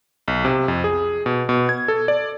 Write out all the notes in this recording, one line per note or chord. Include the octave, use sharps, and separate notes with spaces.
B1
C3
F2
G#4
B2
B2
G#6
A4
D5